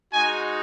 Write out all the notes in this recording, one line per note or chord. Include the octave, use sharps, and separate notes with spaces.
G#3 D#4 F#4 G#5